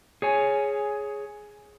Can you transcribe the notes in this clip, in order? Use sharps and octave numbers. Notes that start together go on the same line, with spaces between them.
G#4 C#5 G#5